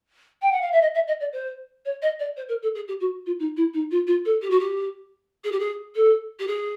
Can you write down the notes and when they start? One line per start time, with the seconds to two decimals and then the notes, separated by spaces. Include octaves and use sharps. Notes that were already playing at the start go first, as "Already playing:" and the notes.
0.42 G5
0.52 F#5
0.61 F5
0.72 E5
0.81 D#5
0.94 E5
1.07 D#5
1.20 D5
1.32 C5
1.85 C#5
2.02 D#5
2.19 D5
2.37 C5
2.48 A#4
2.62 A4
2.75 G#4
2.88 G4
3.00 F#4
3.26 F4
3.39 D#4
3.56 E4
3.73 D#4
3.91 F4
4.07 F4
4.25 A4
4.42 G4
4.50 F#4
4.59 G4
5.44 G#4
5.52 G4
5.59 G#4
5.95 A4
6.39 G4
6.47 G#4